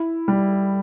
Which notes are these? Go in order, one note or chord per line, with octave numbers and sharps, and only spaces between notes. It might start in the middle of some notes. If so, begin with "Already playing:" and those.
Already playing: E4
G3